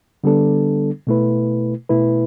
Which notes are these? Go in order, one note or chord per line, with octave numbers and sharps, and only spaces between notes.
D3 G3 B3 D4 A4
B2 A3 E4 B4
B2 A3 E4 B4